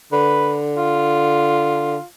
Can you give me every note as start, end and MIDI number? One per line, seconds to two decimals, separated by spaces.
0.12 1.97 50
0.12 0.56 71
0.78 2.04 65